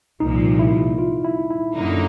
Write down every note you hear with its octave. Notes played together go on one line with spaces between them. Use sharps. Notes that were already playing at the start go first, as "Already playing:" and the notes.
C2 A#2 F3 D#4
E4
F4
E4
E4
F#2 D3 F#3 A#3 D#4